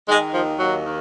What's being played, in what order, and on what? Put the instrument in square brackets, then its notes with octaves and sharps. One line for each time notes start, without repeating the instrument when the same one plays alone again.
[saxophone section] D#3 G#3
D#2 F3
D#2 F#3
D#3